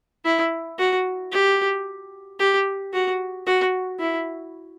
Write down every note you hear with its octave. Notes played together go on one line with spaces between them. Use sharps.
E4
F#4
G4
G4
F#4
F#4
E4